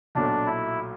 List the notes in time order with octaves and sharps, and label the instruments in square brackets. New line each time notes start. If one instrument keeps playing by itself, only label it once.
[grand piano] B1 A#2 F#3 A3 [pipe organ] D4
[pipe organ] E4